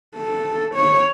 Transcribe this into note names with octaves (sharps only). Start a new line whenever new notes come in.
A4
C#5